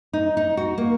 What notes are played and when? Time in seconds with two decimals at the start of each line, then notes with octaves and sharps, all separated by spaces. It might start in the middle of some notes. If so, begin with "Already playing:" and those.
0.13 D#4
0.37 D#4
0.57 F#4
0.78 A#3